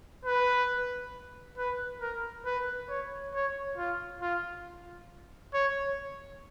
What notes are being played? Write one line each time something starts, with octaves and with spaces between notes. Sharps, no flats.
B4
B4
A#4
B4
C#5
C#5
F4
F4
C#5